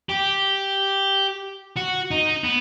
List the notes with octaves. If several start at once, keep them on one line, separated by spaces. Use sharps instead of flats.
G4
F#4
D#4
B3